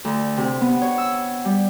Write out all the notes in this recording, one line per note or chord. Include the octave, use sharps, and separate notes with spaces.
D2
C3
B3
C#5
E6
G3